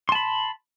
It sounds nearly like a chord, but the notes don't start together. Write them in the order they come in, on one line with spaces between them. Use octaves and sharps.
C6 A5 B5